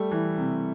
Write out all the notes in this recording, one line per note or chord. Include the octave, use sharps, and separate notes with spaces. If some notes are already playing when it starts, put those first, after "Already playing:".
Already playing: G3 A3
E3
C3